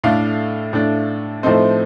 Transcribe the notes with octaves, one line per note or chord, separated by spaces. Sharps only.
A2 A3 D4 F5
A2 A3 D4
A2 F3 A3 C4 D#4 C5